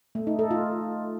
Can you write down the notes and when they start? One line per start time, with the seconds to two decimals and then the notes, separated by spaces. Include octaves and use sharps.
0.15 A3
0.27 D#4
0.39 A4
0.51 F4